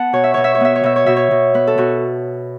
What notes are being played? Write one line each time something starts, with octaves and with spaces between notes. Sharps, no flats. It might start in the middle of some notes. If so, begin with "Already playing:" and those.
Already playing: B3 F#5 A5
B2 C#5
E5
B2 C#5
E5
C#5
B3 E5
C#5
B2 E5
C#5
B2 E5
C#5
B2
B3 B4
A4
B2 F#4